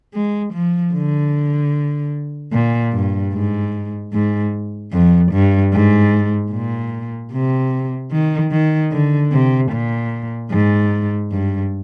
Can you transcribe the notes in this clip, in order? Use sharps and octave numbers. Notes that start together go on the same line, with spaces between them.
G#3
F3
D3
A#2
G2
G#2
G#2
F2
G2
G#2
A#2
C3
D#3
D#3
D3
C3
A#2
G#2
G2